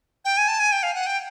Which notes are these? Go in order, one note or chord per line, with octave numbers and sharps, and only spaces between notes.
G5
G#5
A5
G#5
G5
F5
F#5
G5